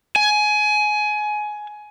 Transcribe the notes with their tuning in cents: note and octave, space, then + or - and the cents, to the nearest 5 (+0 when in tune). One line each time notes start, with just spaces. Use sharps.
G#5 +20